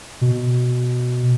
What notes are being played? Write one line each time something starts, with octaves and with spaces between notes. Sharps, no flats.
B2